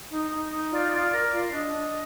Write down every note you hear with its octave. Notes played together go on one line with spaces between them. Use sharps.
D#4
D#4
D#4
F4 D5
F4
A#4
F4
D4 D#5
D4